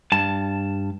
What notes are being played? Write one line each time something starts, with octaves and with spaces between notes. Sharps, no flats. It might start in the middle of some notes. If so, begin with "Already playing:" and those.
G2 A5